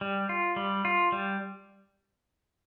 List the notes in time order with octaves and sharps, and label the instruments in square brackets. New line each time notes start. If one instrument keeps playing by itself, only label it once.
[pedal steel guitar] G3
F4
G3
F4
G3